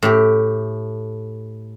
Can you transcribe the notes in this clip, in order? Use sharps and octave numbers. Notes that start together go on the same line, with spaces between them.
A2 G4